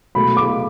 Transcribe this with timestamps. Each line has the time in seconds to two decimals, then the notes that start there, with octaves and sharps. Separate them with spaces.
0.15 B2 F#3 A3 B5
0.37 D6